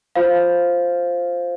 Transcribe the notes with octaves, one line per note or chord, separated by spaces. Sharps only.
F4 C5 F5